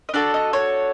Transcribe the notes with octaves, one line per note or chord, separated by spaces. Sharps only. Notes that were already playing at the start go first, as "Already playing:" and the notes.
D#5
D4 F#4 A4 D5
D#5
C#5